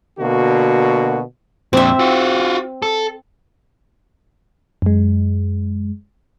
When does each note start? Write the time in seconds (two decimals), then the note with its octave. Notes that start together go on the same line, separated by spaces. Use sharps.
0.19 B2 D3 A#3 F#4
1.73 F2 A#2 C4 E5
1.99 F4 F#4
2.82 A4
4.82 F#2 G#3